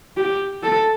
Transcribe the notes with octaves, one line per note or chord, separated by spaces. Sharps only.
G4
A4